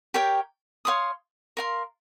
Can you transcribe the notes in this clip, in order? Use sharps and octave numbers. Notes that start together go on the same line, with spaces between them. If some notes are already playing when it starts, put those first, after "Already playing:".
G4 A#4 C#5 G5
C#5 F5 C6 D#6
A#4 F5 C6